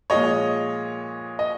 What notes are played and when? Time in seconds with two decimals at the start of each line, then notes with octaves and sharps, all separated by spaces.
0.10 A#2 F3 G#3 C#5 D#5
1.39 D#5